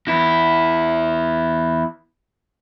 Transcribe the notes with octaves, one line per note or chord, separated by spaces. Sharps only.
E2 E4